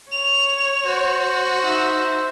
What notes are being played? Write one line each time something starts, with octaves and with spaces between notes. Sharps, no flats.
C#5 F7
F#4 C5
D#4 E5